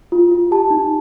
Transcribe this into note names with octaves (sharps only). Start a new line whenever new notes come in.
F4
F4
G4 A5
D#4